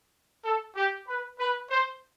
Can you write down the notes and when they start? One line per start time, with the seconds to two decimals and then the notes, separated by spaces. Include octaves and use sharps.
0.45 A4
0.76 G4
1.08 B4
1.39 B4
1.70 C5